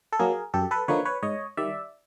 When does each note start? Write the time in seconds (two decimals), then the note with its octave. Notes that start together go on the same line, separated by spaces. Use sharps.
0.12 A4
0.19 F#3 A#3 G#4 A#4
0.54 F#2 G4 A4
0.71 A4 B4
0.88 D3 F3 A#3 D#4 B4 C#5
1.05 B4 C#5
1.22 G#2 C#5 D#5
1.57 D#3 G3 D5 E5